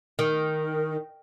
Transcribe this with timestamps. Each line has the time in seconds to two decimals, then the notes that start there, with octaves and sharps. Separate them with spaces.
0.19 D#3